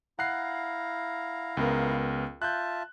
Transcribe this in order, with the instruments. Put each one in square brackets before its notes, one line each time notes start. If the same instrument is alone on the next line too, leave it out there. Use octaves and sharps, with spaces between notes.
[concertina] E4 F5 A#5 [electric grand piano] F#5 F#6 C7
[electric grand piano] C#2 B3 A#4
[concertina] F4 E5 A5 [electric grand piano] F#6 G6